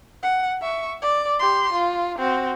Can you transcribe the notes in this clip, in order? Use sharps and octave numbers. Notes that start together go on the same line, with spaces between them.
F#5
E5 C#6
D5
G4 C6
F4
C4 F#4